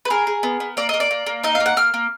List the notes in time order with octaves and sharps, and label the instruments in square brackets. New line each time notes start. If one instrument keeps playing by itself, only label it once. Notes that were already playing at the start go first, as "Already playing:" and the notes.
[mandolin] B4
G#4 A#4
G#4
B3
B3
A#3 D5
A#3 D#5
D5
A#3
A#3
D#4 D#5
F5
A#3
F#5
A#3 F6
A#3